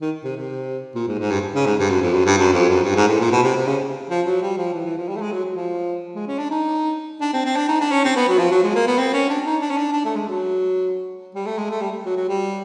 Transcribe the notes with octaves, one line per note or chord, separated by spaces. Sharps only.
D#3
C3
C3
A#2
G#2
G#2
G2
C#3
G#2
G2
F#2
F2
F#2
G2
F#2
F2
F#2
G2
G#2
A2
A#2
B2
C3
C3
C#3
F3
F#3
G3
F3
E3
E3
F3
G3
A3
G#3
F#3
F#3
F3
G#3
C#4
D4
D#4
D4
C4
C4
D4
D#4
D4
C#4
C4
B3
F#3
F3
F#3
G#3
A#3
B3
C4
C#4
D4
D#4
D4
C#4
D4
D4
A3
G#3
F#3
G3
A3
G#3
A3
G3
F#3
F#3
G3